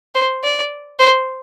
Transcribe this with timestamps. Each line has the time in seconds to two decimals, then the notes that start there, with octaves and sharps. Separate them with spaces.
0.15 C5
0.43 D5
0.99 C5